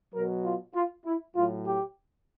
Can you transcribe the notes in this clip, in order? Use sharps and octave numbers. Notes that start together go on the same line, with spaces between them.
B2 F#3 A#4
F4
F4
E4
A2 F#3 F4
G4